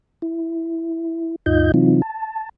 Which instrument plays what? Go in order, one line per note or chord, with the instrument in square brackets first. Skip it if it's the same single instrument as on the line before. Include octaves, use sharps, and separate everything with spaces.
[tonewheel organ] E4
D2 G2 D#4 F4 D#5 G6
C3 E3 F#3 C4 D#4 F4
A5